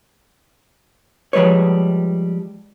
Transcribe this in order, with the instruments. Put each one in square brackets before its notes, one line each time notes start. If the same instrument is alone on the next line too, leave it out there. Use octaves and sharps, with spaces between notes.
[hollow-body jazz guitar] F3 G3 G#3 B4 C#5